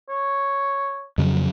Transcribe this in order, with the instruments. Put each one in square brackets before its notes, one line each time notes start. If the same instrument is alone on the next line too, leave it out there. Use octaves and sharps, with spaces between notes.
[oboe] C#5
[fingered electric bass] F2 C#3 F#3